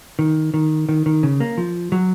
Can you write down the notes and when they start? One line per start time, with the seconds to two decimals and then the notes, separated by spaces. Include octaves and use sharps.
0.19 D#3
0.54 D#3
0.89 D#3
1.06 D#3
1.23 C#3
1.40 A#3
1.58 F3
1.92 F#3